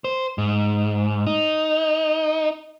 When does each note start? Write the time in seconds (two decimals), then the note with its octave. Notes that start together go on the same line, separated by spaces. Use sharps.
0.04 C5
0.38 G#2
1.26 D#4